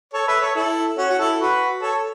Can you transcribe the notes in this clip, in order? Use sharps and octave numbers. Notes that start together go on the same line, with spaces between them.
A4 C#5
B4 E5
A4 C#5
E4 A4
C#4 F#4
F#4
E4 A4
F#4 B4
A4 C#5